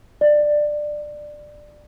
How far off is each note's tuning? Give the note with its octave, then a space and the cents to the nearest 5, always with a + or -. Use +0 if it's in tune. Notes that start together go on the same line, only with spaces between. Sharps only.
D5 +15